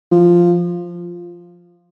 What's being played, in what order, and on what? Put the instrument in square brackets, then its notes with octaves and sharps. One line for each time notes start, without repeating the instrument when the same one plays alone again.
[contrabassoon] F3